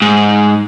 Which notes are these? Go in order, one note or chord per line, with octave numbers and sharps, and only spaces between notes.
G#2